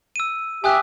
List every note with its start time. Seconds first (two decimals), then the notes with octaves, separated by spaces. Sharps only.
0.16 E6 D#7
0.64 G4 E5 G#5 D#6 F#6